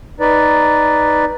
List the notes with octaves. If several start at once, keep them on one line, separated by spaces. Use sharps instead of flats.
D#4 B4 D5